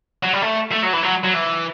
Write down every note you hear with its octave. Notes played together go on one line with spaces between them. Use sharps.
F#3
G3
A3
A3
F#3
E3
F#3
F#3
E3